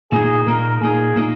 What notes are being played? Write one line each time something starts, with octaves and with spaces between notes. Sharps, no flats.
A#2 A#3 D#4 G#4
A#2 A#3 D#4 A#4
A#2 A#3 D#4 G#4
A#2 A#3 D#4